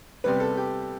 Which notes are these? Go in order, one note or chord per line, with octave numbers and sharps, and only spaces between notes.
C3 G3 B3 B4
A4
G4